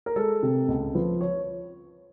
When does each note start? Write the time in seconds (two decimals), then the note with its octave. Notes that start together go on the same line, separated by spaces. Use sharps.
0.06 A#4
0.16 G#3 A4
0.43 C3
0.68 C#2
0.95 F3 B4
1.21 C#5